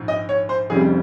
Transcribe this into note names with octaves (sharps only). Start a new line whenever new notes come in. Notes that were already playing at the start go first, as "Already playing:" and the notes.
Already playing: A#1 G#2
D#5
C#5
C5
F1 F2 C#3 G3 G#4